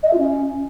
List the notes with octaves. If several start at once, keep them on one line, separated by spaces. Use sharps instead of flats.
D#5
E5
F4
C#4